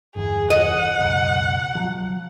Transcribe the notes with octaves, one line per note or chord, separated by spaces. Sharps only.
G1 E2 G#4
D#5 F#5
C#2 F#2 B2
F3 F#3